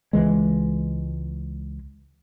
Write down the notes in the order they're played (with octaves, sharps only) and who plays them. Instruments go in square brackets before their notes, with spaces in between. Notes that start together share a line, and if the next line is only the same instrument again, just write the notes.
[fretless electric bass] C#2 E3 G#3